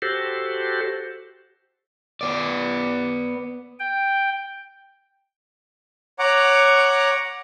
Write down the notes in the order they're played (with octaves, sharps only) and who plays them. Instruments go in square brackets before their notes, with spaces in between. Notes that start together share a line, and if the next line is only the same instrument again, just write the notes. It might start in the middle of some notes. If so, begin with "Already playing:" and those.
[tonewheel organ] F#4 G4 A4 C5
[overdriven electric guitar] B3 D5
[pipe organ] G5
[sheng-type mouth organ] C#5 F#5 A#5 D6